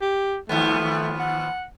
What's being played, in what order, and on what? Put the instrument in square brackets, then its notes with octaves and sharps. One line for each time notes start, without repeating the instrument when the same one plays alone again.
[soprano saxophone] G4
[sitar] D#2 F3 B3 [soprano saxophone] A3
[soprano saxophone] F#5